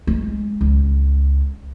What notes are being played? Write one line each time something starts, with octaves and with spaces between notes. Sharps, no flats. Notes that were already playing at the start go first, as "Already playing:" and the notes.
G#3
C#2